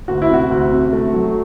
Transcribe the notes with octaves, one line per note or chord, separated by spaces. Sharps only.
D2 F#4
E4
C3 F#4
D2
C3
A3
F#3